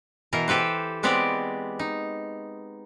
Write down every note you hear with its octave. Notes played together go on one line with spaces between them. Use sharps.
B2 E3 A#4
G4 A4 B4 C5
G#3 B3 C4 G4 D5
D#4